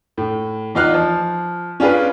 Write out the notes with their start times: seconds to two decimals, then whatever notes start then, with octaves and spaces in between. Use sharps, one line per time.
0.18 A2
0.75 E2 D#4 F4 F5 F6 F#6
0.94 F3
1.80 C#4 D4 F4 G#4 B4